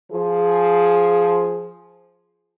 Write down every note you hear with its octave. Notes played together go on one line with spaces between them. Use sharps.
F3 G#4